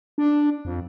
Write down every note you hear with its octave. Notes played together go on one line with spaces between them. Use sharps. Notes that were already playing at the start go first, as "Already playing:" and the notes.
D4
F2